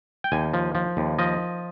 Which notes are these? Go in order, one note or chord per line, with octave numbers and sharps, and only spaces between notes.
G5
D#2 G#5
F3
F3
D#2
F3 D#5